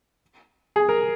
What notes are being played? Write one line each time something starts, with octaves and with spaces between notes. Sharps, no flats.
G#4
A#4